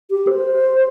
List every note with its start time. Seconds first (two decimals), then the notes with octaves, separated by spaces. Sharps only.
0.11 G4
0.27 C5